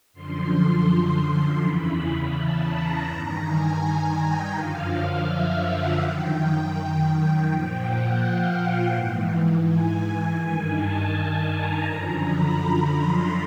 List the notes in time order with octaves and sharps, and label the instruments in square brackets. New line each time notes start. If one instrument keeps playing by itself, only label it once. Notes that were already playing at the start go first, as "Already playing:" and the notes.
[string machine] F#2 D3 F3 C6
C6
C6
E2 C#3 E3 B5
A5
A#5
G2 D#3
G#5
G5
F#2 D3 F3 F5
E5
F#5
F#2 D#3 G5
G5
G5
A#2 F3
F#5
F5
G#2 E3
G#5
G2 D#3
A5
A#5
F#2 D3 F3
B5
C6